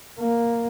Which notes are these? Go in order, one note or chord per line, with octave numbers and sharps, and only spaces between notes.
A#3